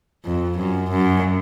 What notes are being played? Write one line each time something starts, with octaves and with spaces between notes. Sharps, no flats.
F2
F#2
F#2